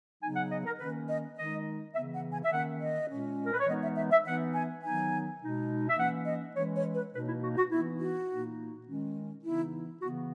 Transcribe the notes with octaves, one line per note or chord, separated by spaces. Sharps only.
C#3 F#3 B3 D#4 G#5
F#5
D#5
A#4
D#3 A#3 C#4 B4
D#5
D#3 G#3 D#4 D#5
C#3 E3 B3 E5
F#5
G#5
E5
D#3 A#3 C#4 F#5
D#5
A#2 G#3 C#4
A#4
B4
C#5
E3 G#3 B3 D#4 D#5
E5
E5
E5
E3 B3 D#4 F#5
G#5
D#3 F#3 B3 D#4 G#5
B2 G#3 D#4
E5
E3 A#3 C#4 F#5
D#5
E3 G#3 C#4 C#5
C#5
B4
B2 A#3 D#4 B4
E4
F#4
F#4
E3 B3 D#4 E4
F#4
A#2 A#3 D#4
D#3 G#3 C#4
C#3 E3 B3 D#4 E4
C#3 E3 B3 F#4